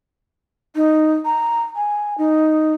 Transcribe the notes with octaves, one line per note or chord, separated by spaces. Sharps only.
D#4
A#5
G#5
D#4